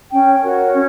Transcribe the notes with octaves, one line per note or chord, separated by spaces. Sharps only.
C#4 G5
F#4 A#4 C#5
C#4